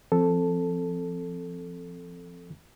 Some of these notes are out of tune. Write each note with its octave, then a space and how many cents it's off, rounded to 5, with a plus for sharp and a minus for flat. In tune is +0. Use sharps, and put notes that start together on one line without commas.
F3 -25 C4 +0 A4 +0